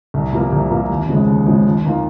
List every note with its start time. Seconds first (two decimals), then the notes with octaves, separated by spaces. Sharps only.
0.14 C2
0.33 C3 F3 A#3
0.52 C2
0.71 C3 F3 A#3
0.90 D#2
1.09 C#3 F3 G#3
1.27 D#2
1.46 C#3 F3 G#3
1.65 D#2
1.85 D#3 A#3 F4